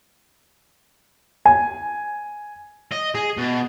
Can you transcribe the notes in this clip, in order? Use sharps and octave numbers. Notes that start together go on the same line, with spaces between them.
G#5
D#5
G#4
B2